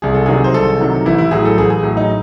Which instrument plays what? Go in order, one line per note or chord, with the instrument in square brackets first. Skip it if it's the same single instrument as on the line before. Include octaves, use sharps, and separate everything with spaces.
[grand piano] C2 G#4
A4
C3 D#3 F#3 G#4
C5
C2 A4
C3 D#3 F#3
A1 E4
E4
A2 F#3 G#4
A4
A1 G#4
G#4
A2 F#3
D#4